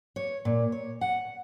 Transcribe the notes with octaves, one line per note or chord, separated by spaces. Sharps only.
C#5
A#2
C#5
F#5